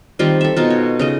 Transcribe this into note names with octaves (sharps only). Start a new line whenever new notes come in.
D#3 G3 C4 F4
A4 E5
B2 D#4 F4
C#5
C#3 D#4 D#5